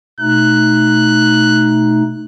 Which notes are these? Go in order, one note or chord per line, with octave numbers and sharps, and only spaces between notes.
B2 A3 D#4 F#6